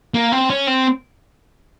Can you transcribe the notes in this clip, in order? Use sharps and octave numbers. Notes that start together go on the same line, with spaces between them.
A#3
C4
C#4
C4